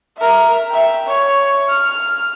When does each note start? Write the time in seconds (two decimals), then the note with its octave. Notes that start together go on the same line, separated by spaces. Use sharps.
0.18 A#4 E5
0.69 E5 G5
1.08 C#5
1.69 F6